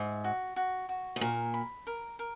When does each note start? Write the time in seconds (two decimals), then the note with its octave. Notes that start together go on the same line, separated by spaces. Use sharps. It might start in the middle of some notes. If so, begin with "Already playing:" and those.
Already playing: G#2 E5
0.24 F#4
0.56 F#4
0.89 F#4
1.16 G#2
1.21 A#2 A#4
1.54 B5
1.87 A#4
2.19 A#4